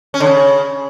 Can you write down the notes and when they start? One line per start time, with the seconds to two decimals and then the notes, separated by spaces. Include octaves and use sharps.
0.14 C#4
0.20 D3
0.27 C#3